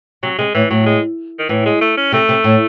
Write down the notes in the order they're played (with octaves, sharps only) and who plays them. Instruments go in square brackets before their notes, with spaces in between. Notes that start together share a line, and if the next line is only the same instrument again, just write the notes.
[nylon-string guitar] C3 [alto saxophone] F#3
[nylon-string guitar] C3 [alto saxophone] G#3
[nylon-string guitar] A2 [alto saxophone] E3
[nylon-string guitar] A2 [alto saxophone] F#3
[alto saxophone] G#3
D#3
[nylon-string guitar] A2 [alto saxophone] E3
[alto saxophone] G#3
A3
C#4
[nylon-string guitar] C3 [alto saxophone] A3
[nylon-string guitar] C3
A2